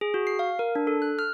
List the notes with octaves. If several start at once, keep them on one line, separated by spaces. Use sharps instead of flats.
G#4
F#4
C7
F5
A#4
D4
A4
F#6
F6